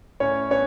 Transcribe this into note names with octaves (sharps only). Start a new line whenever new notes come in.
A2 C#4 C#5
B3 C#4 D4 C#5